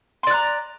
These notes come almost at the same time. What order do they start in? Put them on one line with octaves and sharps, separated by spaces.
C6 D5 F#6 A#5